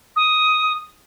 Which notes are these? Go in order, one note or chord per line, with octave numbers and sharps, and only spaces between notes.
D#6